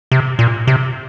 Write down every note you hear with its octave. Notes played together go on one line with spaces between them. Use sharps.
C3
A#2
C3